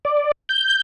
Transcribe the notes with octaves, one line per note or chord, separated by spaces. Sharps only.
D5
G6